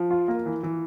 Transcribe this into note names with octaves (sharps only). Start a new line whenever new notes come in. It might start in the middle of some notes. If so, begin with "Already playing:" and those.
Already playing: F3
F4
A#3
E3
E3